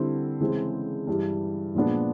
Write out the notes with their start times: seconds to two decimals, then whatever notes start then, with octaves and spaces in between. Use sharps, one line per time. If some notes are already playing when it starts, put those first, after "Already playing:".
Already playing: D3 G3 C4 E4
0.40 C#3 E3 G#3 C4
1.07 G2 E3 G3
1.75 A#2 F3 G#3 B3 D4